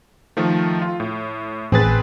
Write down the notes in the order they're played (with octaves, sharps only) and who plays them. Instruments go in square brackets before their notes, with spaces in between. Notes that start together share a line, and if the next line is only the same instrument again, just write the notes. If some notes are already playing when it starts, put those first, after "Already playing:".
[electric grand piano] D#3 F3 A3
F4
A2
[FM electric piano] A1 A6 [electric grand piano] C4 G#4 B4